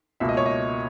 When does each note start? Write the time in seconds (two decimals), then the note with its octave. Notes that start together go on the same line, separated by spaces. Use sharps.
0.20 C#2 B2 A#3 E5
0.29 D#5
0.37 C#5
0.46 D#5